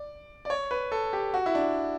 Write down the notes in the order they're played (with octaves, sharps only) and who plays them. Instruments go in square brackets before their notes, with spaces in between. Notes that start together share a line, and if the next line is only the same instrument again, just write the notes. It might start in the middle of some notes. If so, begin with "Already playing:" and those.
Already playing: [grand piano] D5
D5
C#5
B4
A4
G4
F#4
E4
D4